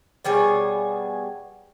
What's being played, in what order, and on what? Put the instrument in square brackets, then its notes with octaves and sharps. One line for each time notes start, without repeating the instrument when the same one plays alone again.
[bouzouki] B2 G3 G#4 C#5